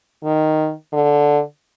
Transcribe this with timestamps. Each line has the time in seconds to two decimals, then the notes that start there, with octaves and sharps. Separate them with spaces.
0.24 D#3
0.93 D3